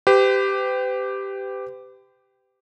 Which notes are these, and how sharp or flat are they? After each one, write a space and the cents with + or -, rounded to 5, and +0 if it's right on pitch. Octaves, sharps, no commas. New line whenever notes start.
G4 +0 B4 +45